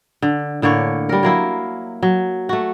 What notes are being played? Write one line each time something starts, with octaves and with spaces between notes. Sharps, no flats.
D3
A2 D3 A#3 C#5
G3 A#4
F#3 A#3 E4
F#3
A3 F#4